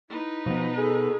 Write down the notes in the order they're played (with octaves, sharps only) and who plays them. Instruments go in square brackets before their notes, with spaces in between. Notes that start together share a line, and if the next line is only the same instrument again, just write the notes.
[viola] D#4 B4 [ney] E4
[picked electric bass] B2 B3 [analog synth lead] F3 [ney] D#5
[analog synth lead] G#4 [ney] A4